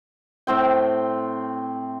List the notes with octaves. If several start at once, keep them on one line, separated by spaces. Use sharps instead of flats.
A2 C4 G5